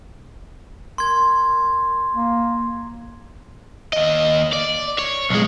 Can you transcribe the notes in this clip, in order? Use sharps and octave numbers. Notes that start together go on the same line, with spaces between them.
A#4 C6 G#6
A#3
D#2 D#5
D5
C#5
B1 G#3